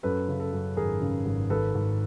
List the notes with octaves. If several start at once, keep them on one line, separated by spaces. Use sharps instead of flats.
F#2 A4 B4
C#3
A4
F#2
G#1 G#4 A#4
C#3
G#1
G#1 A4 B4
G#1